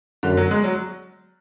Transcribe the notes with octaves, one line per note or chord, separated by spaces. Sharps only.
F#2 D3
F#3
G#3
F#3